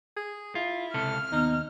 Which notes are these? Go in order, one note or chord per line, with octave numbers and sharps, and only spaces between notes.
G#4
E4 F4
C#2 C3 A4 F6
D#2 B3 D#4